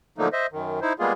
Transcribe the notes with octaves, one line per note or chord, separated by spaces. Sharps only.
D3 F3 F#3 A3 A#3 D#4
C5 D#5 E5
F#2 D#3
D#4 E4 C5
G3 G#3 A#3 B3 F4 G#4